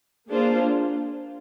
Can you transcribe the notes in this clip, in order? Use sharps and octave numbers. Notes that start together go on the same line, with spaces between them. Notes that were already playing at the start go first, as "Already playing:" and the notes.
A#3 D4 F4 G#4 C5